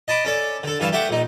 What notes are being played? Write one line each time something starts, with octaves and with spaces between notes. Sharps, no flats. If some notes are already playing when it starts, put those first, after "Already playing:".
D#5 A5 B5 D6
C#4 A4 D5
D3 A4
G2 E3 E5 F5 A5
A3 G4 E5 F#5
A#1 D#4